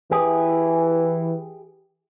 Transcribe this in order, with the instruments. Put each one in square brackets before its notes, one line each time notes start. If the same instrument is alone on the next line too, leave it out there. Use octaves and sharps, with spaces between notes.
[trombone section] E3 [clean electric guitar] G4 G#4